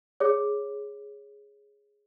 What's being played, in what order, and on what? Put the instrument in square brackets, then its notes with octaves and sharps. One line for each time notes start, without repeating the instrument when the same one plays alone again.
[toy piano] G#4 C#5